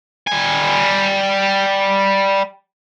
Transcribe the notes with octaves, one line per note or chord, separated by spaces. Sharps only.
G3 G#5